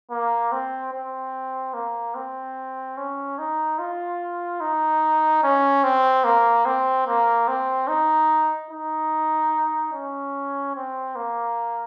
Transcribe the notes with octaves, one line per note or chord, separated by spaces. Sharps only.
A#3
C4
C4
A#3
C4
C#4
D#4
F4
D#4
C#4
C4
A#3
C4
A#3
C4
D#4
D#4
C#4
C4
A#3